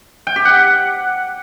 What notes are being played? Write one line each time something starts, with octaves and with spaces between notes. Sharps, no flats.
G5
G4
F#5